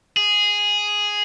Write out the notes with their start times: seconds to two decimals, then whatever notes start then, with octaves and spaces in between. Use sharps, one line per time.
0.17 G#4